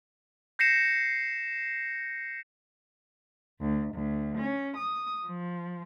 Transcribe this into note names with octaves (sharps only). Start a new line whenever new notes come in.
G6 A#6 C7 C#7 E7
D2
D2
C#4
D#6
F3